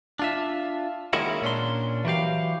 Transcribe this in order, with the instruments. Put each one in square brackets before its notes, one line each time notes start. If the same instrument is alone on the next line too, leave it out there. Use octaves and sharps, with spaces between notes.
[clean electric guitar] D4 F4 E5
D#3 G#3 A#3 C#4 E4 F#4
A#2 C#4 D4 C6
E3 F#3 G4 F5